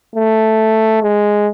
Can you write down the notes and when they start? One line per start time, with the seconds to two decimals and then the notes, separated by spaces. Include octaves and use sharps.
0.16 A3
1.03 G#3